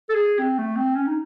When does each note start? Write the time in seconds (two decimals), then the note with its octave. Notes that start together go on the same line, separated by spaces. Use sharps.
0.09 A4
0.14 G#4
0.39 C4
0.58 A3
0.76 C4
0.96 C#4
1.07 D#4